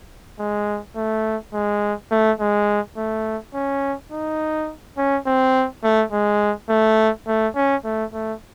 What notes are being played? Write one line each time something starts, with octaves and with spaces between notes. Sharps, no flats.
G#3
A3
G#3
A3
G#3
A3
C#4
D#4
C#4
C4
A3
G#3
A3
A3
C#4
A3
A3